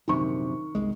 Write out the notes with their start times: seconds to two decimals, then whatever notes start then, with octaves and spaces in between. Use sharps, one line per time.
0.08 A#1 F#2 C3 D#3 C#6
0.75 G1 C2 G#3